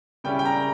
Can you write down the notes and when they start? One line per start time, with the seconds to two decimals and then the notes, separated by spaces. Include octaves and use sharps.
0.24 C#3 G3 C#4 E4 G5
0.39 G5
0.45 A#5